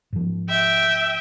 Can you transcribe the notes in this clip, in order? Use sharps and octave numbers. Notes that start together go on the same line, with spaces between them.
G#2 F3
E5 G5